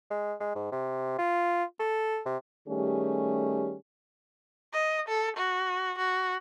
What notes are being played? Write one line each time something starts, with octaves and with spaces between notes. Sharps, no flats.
G#3
G#3
G#2
C3
F4
A4
C3
D#3 G3 A3 C#4 G4 G#4
D#5
A4
F#4
F#4